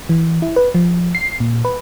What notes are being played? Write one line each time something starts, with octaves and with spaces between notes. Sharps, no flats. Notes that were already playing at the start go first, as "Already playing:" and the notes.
E3
E4
B4
F3
C7
A#2
B4